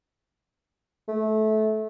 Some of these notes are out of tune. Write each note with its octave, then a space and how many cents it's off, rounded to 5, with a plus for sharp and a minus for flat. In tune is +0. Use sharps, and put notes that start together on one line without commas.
A3 -20